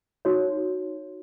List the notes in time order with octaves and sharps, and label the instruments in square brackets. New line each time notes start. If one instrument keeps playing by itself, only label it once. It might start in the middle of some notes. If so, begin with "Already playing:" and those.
[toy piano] D#4 F#4 C#5